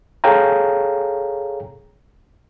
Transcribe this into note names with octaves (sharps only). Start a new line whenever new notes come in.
G#4 A4 C#5 F5 G5 A#5